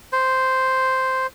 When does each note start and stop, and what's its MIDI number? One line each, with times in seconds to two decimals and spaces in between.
0.12 1.27 72